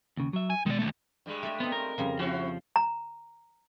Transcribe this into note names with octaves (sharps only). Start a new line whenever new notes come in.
D#2 C#3
F#3 E5
G#5
B2 D#3 G#3 D5
D#2 A3
G2 G3 G#3
A3 D5 E5
B3 C4 D#4
A#4
F2 C#3 G3
F3 C4 E4 F#4
A#5